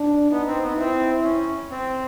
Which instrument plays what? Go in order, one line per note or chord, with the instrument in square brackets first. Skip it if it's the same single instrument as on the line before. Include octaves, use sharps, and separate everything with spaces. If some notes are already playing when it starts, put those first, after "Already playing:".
Already playing: [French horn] D4
[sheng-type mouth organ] B3 [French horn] D#4
[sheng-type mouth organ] C4
B3
[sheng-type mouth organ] C4 [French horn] E4
[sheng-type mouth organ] C#4
C4